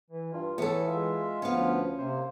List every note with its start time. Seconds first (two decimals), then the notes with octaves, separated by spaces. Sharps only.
0.11 E3
0.33 G2 F4
0.58 A2 E3 B3 A4
0.88 G#3 F4 E5
1.42 D2 F3 B3 C#4 F5
1.98 C3 A#3 C5